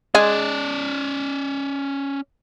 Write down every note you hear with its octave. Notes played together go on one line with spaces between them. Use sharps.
G#3 C#4 G#4 D5 G#5